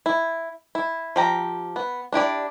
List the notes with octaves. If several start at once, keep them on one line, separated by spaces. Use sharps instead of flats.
E4
E4
F3 G4 A#5
B3
D4 E4 G4 D5